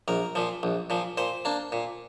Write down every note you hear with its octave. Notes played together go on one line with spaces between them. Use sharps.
A#1 A#4
A#2 F3
A#1
A#2 F3
A#2 C5
A#3 D4
A#2